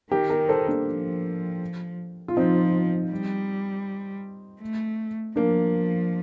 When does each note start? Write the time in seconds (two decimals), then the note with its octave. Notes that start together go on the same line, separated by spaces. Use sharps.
0.11 D#3 G4 A#4
0.30 G4 A#4
0.49 A4 C5
0.68 A#3 D4
0.86 F3
2.28 F4
2.36 F3 C4 D#4
3.11 G3
4.61 A3
5.36 F3 A#3 D4